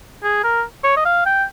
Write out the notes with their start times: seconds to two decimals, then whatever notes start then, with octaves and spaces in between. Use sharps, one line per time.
0.23 G#4
0.44 A#4
0.84 C#5
0.96 D#5
1.05 F5
1.25 G5